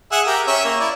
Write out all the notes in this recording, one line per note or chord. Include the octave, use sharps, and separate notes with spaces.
G#4 E5 F#5
G4 A#4
C#4 E5
A#3
E4 D5